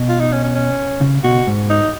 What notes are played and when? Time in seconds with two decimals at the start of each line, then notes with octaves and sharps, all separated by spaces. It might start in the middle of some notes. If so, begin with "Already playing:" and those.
Already playing: B2
0.09 F4
0.20 D#4
0.32 C#4
0.44 C#4
0.55 C#4
1.01 C#3
1.24 B2 F#4
1.47 G#2
1.70 D#4